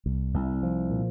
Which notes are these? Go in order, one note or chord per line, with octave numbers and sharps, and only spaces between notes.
C2
C2
F3
A#2